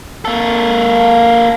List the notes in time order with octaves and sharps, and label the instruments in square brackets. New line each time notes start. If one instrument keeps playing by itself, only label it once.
[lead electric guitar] A#3 A4